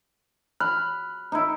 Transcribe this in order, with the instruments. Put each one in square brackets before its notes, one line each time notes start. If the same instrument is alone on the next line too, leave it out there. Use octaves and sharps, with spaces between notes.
[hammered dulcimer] B5 [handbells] F6 F#6
[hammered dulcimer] D#4 E4